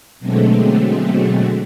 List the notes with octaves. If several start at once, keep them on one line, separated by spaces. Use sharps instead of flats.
B2 D3 F#3 G#3 A3 C4